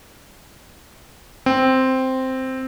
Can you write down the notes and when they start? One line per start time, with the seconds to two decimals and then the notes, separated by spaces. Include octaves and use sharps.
1.46 C4